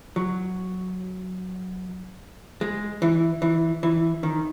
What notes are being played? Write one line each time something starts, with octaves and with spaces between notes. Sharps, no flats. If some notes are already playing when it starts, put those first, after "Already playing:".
F#3
G#3
E3
E3
E3
D#3